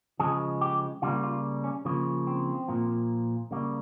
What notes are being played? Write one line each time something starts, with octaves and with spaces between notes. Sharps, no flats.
C#3 F3 G#3 G#4
G4
C#3 G3 A#3 F4
F4
C#4
C#3 F3 A#3
C4
A#2 F3 A#3
C#3 G3 A#3